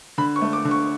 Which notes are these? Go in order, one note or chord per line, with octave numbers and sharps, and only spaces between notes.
D3 B5
C#6
A3
D6
D3
C#6